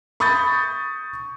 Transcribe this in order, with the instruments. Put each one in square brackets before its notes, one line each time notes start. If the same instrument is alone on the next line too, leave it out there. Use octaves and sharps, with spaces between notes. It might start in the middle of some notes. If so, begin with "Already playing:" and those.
[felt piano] B5 C#6 D#6 G6 A6